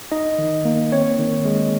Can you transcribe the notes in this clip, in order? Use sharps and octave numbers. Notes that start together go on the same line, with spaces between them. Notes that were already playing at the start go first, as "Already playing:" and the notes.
D#4 D#5
D#3
A#3
C4 C#5
D#3
G#3